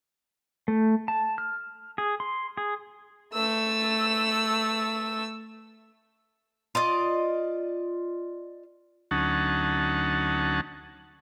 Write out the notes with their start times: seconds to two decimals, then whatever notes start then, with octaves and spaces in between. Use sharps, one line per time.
0.68 A3
1.08 A5
1.38 F6
1.98 G#4
2.20 C6
2.57 G#4
3.34 A3 E6
6.75 F4 D5 D#5
9.11 D2 F#3 C#4 D#4 F#5 A5